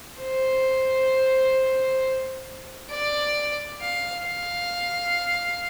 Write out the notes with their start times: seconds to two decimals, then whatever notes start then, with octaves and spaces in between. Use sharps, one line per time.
0.20 C5
2.91 D5
3.81 F5
4.26 F5